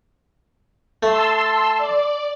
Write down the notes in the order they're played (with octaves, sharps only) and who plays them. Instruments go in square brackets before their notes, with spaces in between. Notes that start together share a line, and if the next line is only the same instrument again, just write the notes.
[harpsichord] A3 [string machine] A5 C6 E6
[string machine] D5